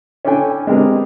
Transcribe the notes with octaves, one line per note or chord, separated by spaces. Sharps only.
C#4 D4 E4 A4 G5 G#5
G#3 B3 C4 D4 G4 A#4